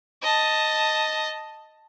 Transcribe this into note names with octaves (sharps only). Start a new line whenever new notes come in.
D#5 A5